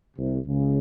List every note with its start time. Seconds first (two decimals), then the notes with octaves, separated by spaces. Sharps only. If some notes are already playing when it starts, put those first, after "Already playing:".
0.17 C2 C3
0.46 C#2 C#3